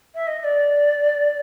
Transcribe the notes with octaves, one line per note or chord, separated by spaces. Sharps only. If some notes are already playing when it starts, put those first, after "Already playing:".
E5
D#5
D#5
D5